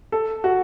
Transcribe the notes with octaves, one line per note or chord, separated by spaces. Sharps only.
A4
F#4